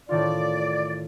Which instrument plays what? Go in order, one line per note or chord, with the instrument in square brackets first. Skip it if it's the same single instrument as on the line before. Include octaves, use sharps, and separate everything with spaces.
[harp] A2 D#3 F4 [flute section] D5